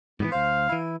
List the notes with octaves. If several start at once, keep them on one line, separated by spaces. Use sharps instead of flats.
G#2 C3 E3 B3
D2 C5 F5
E3 E4